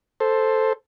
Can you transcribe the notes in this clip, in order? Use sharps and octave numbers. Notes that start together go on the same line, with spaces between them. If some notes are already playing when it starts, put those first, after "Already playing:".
A4 C5